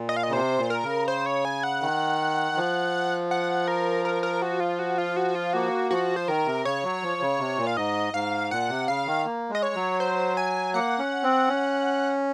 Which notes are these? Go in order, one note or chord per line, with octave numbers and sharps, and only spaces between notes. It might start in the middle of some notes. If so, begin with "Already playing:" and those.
Already playing: A#2
D#5
F5
D#5
C#3
C3 C5
A#2
A#4
C#3
C5
C#5
G#5
F#5
D#3
F3
F#5
A#4
A#4
A#4
F#4
F4
F#4
F4
F#4
F4
A#3 F#4
F3 F#4
C5
D#3 A#4
C3
C#3 C#5
F#3
F3
C#3
C3
A#2
F5
G#2 D#5
G#2 F5
A#2 F#5
C3
C#3 F5
D#3
A#3
G#3
D#5
C#5
F#3
C5
G#5
A#3 F#5
C#4
C4
C#4